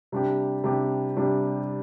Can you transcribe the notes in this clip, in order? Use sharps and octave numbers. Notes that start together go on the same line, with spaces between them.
C3 G3 D4 G4
C3 G3 D4 G4
C3 G3 D4 G4